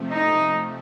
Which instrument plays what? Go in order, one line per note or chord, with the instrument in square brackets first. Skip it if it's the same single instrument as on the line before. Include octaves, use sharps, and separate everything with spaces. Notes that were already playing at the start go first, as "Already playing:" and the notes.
Already playing: [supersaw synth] C3 F3 A3
[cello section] D#4